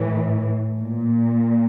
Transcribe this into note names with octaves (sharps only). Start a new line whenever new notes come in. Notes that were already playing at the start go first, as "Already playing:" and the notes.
Already playing: A2 E3
A#2